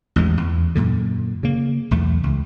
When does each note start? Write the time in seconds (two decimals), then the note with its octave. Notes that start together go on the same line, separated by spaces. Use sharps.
0.16 A1 E2 G#3
0.37 E2
0.75 F#2 A#2 D3
1.43 C#3 A#3
1.91 B1 E2 A3
2.23 C#2